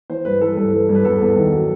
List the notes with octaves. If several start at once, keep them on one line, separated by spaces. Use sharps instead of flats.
E3 C5
G2 B4
E3 A4
G2 A4
E3
G2
B4
E2 A4
E2
D#3
F#3